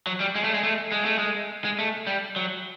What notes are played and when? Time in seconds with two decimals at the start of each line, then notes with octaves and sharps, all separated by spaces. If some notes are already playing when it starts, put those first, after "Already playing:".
0.07 F#3
0.20 G3
0.35 G#3
0.44 A3
0.54 G#3
0.63 A3
0.92 G#3
1.05 A3
1.19 G#3
1.65 G#3
1.79 A3
2.07 G3
2.36 F#3